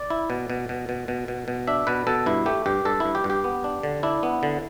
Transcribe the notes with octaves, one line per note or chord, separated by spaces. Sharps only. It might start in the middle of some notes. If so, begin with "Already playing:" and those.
Already playing: D5
E4
B2
B2
B2
B2
B2
B2
B2
D4 E5
B2 B4
B2 A4
G2 E4
A3 G4
G2 G4
G2 A4
G2 E4
G4
G2
G4
B3
D4
D3
D4 E4
B3
D3